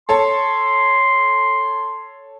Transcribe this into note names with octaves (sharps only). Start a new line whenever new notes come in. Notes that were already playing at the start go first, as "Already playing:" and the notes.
A4 C#5 A5 C6